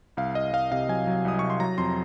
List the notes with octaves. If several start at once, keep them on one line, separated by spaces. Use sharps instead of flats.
C2 F5
C2 D#5
C2 F5
C3 F5
F#3 G#5
F#3
C2 D#6
C2 C#6
C6
F#3 A#5
F2 C6